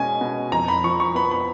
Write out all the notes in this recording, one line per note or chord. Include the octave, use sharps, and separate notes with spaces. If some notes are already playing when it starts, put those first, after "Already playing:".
Already playing: B2 G#3 C#4 G#5
B2
F2 A#5
B5
F3 C#6
C#6
B3 B5
B5